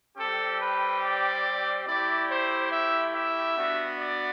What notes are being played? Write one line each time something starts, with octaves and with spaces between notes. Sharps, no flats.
G3 C4 G4 A4
B4
D5
A3 E4 G4 D5
C5
E5
E5
B3 D4 F#4
D5